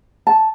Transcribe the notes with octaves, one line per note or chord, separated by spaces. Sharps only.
A5